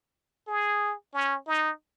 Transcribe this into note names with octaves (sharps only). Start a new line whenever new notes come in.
G#4
C#4
D#4